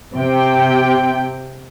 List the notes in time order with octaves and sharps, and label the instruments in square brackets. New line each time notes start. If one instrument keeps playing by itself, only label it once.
[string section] C3 G5